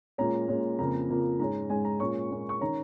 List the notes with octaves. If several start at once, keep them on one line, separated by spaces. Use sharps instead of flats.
A#2 G#3 C#4 A#5
A#2 G#3 C#4
F2 C#3 F3 A#3 A#5
F2 C#3 F3 A#3
G#2 G#3 C#4 A#5
G#2 G#3 C#4 G#5
A#5
A#2 G#3 C#4 C#6
A#2 G#3 C#4
C#6
D#3 C#4 A#5